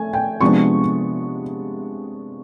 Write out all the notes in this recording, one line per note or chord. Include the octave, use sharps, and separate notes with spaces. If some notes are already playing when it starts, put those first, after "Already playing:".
Already playing: A3 G#5
G5
C3 F3 G#3 B3 D4 C#6